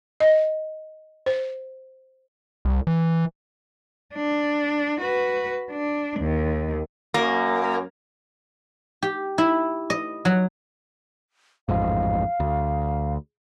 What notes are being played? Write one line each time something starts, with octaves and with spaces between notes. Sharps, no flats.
D#5
C5
C2
E3
D4
F#4 B4
D4
D#2
F#2 A#3
G4
E4
D#5
F#3
A1 F2 G#2 F5
D2